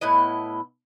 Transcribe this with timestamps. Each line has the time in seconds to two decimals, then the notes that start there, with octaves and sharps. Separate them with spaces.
0.01 A2 B3 E4 D#5